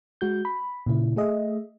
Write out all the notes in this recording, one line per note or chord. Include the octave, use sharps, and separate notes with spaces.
G#3 F#4 G6
B5
A#2 C#3 E4
A3 G#4 D#5 E5